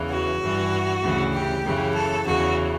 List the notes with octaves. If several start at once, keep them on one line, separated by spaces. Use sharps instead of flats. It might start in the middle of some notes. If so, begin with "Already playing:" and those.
Already playing: E2 C#3 E3
F#4
G2 E3
D2 C#3 E3
G4
F#2 C#3 E3
A4
E2 C#3 E3 F#4